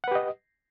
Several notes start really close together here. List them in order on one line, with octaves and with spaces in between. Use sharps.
F#5 B4 G4 D#5